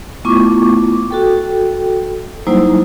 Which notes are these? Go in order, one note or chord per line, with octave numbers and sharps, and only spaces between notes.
A3 B3 E4 F4 C#6 D6
F#4 A4 G5
F#3 G3 A#3 D#4 E4 C5